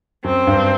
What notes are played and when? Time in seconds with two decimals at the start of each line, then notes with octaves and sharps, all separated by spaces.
0.24 F#2 C4
0.47 G2